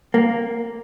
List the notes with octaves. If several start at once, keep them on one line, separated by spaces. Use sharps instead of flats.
A#3